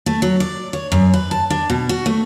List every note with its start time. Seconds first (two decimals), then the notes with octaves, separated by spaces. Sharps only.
0.06 A3
0.22 F#3
0.40 D5
0.73 C#5
0.92 F#2
1.14 B4
1.31 A5
1.50 D4
1.70 B2
1.89 F#4
2.06 A3